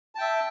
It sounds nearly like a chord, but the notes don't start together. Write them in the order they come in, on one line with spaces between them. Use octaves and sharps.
A5 G5 E5